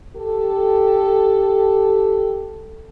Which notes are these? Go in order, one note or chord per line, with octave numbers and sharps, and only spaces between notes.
G4 A4